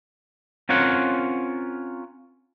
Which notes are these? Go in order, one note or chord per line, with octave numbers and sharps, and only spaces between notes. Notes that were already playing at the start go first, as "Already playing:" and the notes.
C4 C#4 F4 A#4 C#5 F#5